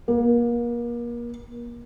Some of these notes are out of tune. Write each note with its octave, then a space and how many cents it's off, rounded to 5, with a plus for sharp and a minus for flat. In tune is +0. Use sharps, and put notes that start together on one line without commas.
A#3 +35